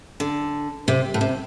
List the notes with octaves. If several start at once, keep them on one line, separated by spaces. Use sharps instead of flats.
D3
C3
A2
C3